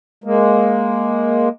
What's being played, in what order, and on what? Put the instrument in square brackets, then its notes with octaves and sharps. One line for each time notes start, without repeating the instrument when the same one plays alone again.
[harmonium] G#3 A#3